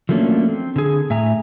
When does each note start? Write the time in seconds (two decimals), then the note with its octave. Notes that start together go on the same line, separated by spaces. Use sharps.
0.09 F3 F#3 A3 A#3 C#4 D4
0.49 C4
0.76 D3 G#4
1.10 A2 E5 G#5 A#5